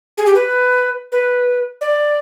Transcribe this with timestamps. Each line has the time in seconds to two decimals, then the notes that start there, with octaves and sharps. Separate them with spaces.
0.18 G#4
0.26 G4
0.35 B4
1.12 B4
1.81 D5